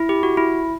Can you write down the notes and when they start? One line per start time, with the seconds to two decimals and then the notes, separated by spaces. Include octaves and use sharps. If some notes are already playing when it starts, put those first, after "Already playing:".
Already playing: E4
0.09 G4
0.23 F#4
0.37 E4